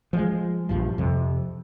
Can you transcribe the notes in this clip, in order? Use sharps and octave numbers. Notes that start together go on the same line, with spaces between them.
F3 G3 G#3
A#1 G2 F3
F2 C3